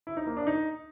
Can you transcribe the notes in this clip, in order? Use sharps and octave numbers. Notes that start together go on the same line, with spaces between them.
E4
D#4
A#3
D4
D#4